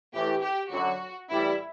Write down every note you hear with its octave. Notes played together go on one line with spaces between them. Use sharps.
A2 E3 A3 G4
G4
F#2 D3 F#3 F#4
A2 E3 G3 E4